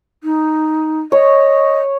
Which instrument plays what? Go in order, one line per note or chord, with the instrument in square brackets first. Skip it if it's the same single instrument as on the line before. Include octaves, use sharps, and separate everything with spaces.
[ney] D#4
[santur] C#5 [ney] D#5